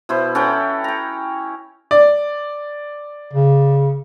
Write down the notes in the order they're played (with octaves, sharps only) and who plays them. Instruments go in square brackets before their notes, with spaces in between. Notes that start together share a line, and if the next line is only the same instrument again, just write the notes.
[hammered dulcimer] B2 E4 C5
C#4 A4 F#5 G5
G5 A#5
[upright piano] D5
[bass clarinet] C#3